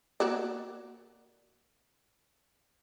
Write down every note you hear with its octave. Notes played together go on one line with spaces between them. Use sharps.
A#3 F#4 D5